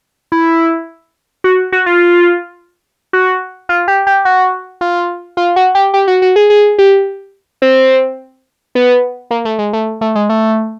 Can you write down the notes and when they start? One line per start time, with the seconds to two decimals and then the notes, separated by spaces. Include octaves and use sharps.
0.32 E4
1.44 F#4
1.72 F#4
1.86 F4
3.13 F#4
3.69 F4
3.88 G4
4.07 G4
4.25 F#4
4.81 F4
5.37 F4
5.56 F#4
5.75 G4
5.94 G4
6.08 F#4
6.22 F#4
6.36 G#4
6.50 G#4
6.78 G4
7.62 C4
8.75 B3
9.31 A#3
9.45 A3
9.59 G#3
9.73 A3
10.01 A3
10.15 G#3
10.29 A3